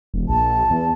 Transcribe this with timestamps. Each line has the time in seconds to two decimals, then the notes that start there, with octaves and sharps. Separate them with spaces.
0.14 E1
0.29 A#1 A5
0.70 E2